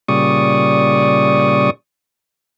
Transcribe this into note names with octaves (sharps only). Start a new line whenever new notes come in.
A#2 C#3 G3 D5 C#6 D#6